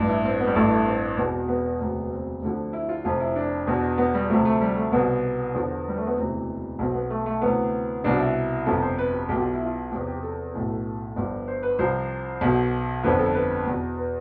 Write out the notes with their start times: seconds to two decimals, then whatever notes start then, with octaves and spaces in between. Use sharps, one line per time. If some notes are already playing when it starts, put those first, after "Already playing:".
Already playing: A1 G2 E3
0.09 E4
0.24 C4
0.40 B3
0.47 G3
0.55 A1 G2 E3 A3
0.70 A3
0.86 C4
1.18 E1 E2 B2
1.48 B3
1.80 E1 D2 C3
2.11 C4
2.42 D2 D3 F3
2.73 E4
2.89 F4
3.04 F1 F2 C3 F3 F4
3.20 E4
3.36 D4
3.67 E2 B2
3.98 B3
4.14 G3
4.29 D2 C3 F3 A3
4.45 A3
4.61 G3
4.76 A3
4.92 C2 B2 B3
5.54 E2 D3 F3
5.88 G3
5.98 A3
6.07 B3
6.17 E1 D2 C3 E3 C4
6.79 B1 B2 C4
6.94 B3
7.10 A3
7.26 A3
7.41 D2 C3 E3 B3
8.04 C2 B2 D4
8.20 E4
8.66 G1 F2 C3 F3 A4
8.82 C5
8.98 B4
9.13 G4
9.29 B1 B2 G4
9.42 F4
9.54 E4
9.65 F4
9.91 E2 C3 F3 G4
10.07 G4
10.23 A4
10.54 B1 A2 E3
11.16 G1 G2 F3
11.48 C5
11.63 B4
11.79 C2 C3 F3 C5
12.41 B1 B2
13.04 G1 F2 D3 F3 B4
13.19 A4
13.35 B4
13.66 E2 B2
13.97 B4